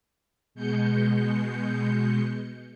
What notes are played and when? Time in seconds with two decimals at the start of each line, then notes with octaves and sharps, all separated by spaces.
0.55 B2 G#3 G6 C#7